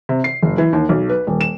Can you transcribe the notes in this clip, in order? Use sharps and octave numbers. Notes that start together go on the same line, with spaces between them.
C3
C7
F#1
E3
D#2
B1
B4
D#1
E7